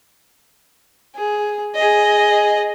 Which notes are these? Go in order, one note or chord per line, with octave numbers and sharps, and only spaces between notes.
G#4
G#4 D#5